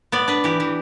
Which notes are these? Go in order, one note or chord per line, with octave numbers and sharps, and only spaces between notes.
B3 D5
D4 B4
E3 G4
E3